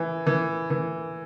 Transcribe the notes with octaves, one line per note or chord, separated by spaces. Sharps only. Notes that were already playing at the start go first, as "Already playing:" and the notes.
Already playing: E3
E3
E3